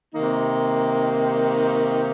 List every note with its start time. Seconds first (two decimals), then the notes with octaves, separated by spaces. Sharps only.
0.14 C3 D#3 A#3 D#4